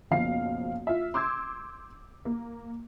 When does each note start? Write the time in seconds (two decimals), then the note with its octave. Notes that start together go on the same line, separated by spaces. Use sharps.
0.11 F#1 B1 F3 F5 C7
0.87 F4 E5
1.14 C6 D6 E6 G6 G#6
2.25 A#3